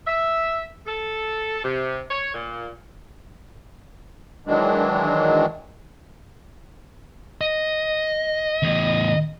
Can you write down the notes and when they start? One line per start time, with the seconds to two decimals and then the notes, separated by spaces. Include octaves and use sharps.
0.07 E5
0.86 A4
1.64 C3
2.10 C#5
2.34 A#2
4.46 D#3 E3 F#3 G#3 D4
7.41 D#5
8.63 E2 A2